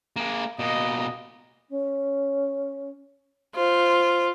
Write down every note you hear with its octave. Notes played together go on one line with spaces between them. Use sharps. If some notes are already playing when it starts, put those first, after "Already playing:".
A#3 G#4
B2 A#3 D#5
C#4
F4 C5